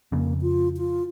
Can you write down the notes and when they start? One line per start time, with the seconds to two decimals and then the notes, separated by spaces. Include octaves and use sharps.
0.12 F2 C#3 A#3
0.42 F4
0.77 F4